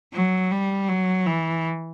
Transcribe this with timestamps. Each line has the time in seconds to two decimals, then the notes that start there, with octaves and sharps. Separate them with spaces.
0.13 F#3
0.51 G3
0.88 F#3
1.26 E3